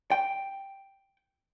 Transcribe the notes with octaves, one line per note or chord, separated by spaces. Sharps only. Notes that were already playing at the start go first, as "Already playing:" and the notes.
G5